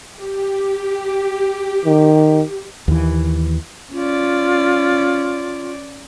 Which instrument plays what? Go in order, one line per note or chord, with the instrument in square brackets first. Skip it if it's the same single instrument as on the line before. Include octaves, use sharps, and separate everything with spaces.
[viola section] G4
[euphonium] D#3
[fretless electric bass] D#2 E3
[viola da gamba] C#4 D5 [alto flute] F4